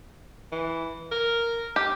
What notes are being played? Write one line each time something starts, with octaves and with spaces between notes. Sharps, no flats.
E3
A#4
G4